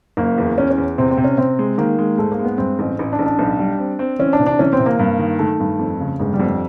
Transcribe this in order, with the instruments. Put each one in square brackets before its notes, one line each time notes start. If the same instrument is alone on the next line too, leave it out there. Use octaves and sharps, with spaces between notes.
[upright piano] F#1 [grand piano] A#3
[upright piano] E2
[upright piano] E2 [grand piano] C#4
[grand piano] C#4
[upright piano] E2
[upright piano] C3 [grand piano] C4
[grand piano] C4
[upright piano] C3
[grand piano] C#4
[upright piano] C3 [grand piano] C4
[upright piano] G#3
[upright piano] D#3 [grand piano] A#3
[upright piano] G#3
[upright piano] G#2 [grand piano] A3
[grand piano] A#3
[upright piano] G#3
[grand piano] B3
[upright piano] G2 [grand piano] C4
[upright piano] A1
A1
[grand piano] D4
[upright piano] A1
[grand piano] D4
[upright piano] B1
G3
C4
C4
[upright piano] E3 [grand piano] C#4
[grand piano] D4
[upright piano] C3
[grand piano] D4
[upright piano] E3 [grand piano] C#4
[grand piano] C4
[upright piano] C3
[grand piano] A#3
[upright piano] G2
D#3
[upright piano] D#3 [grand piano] A3
[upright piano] G2
F2
C#3
[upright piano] G1 [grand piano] G#3
[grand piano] G3
[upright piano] F2
[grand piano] G3